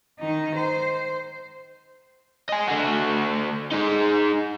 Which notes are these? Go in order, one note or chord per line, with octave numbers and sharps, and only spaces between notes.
D#3 D#4
C5
D#5 G#5
D3 F#4
D#4 G#4